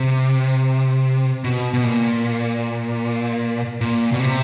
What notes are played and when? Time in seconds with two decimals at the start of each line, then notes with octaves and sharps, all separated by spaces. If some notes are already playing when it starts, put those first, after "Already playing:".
Already playing: C3
1.44 B2
1.74 B2
1.84 A#2
3.81 A#2
4.12 B2
4.20 C3